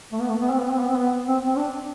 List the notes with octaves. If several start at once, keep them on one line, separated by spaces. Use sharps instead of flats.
A3
B3
A3
B3
C4
B3
C4
B3
C4
B3
C4
C4
D4